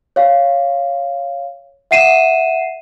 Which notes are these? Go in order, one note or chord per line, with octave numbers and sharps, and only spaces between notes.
C#5 F5
E5 F#5 C7 D#7 E7